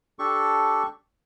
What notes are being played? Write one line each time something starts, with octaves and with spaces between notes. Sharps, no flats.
D4 G4 A4 C#6